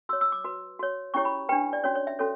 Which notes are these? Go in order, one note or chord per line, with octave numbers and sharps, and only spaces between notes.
F#4 C#5 E6
E6
D6
F#4 B4
F#4 C#5
C#4 E4 G4 C#5 C#6
B5
D4 G4 B4 G5
D5
C#4 F#4 C#5
C#5
E5
C#4 F#4 A4 C#5